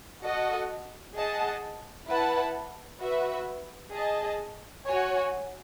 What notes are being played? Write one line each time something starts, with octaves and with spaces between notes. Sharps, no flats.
F#4 A4 D#5 F#5
G#4 D#5 F#5 A5
E4 B4 F#5 A5
F#4 B4 E5
G#4 D#5 A5
F#4 C#5 G#5